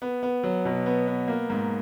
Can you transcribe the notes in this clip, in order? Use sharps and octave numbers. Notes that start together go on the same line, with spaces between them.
B3
B3
F#3
B2
B3
B3
A#3
G#2